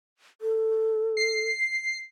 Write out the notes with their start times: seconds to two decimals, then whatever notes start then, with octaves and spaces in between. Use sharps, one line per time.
0.41 A4
1.17 C7